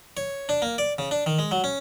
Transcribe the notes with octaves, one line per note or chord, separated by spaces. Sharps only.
C#5
D4
A#3
D5
C#3
D4
D#3
G#3
F#3
C#4